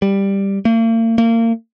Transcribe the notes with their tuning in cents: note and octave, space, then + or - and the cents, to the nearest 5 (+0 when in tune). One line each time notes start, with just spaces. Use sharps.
G3 +5
A#3 -45
A#3 -30